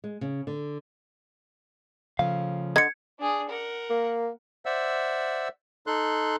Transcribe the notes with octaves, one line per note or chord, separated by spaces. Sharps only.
G#3
C#3
D3
C#3 F3 A3 F5
D3 D#5 G#6 C#7
D4 G#4
A#4 F#5
A#3
C5 D5 E5 F#5 E6
D#4 A4 C6 F#6